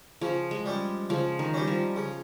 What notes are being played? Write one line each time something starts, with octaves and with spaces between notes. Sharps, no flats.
C#3 F3
G#3
G3 C#4
C#3 F3
D#3
G3 C#4
F3
C#3